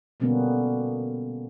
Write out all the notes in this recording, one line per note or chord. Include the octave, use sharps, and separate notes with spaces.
B2 D3 G3 A#3 B3 C#4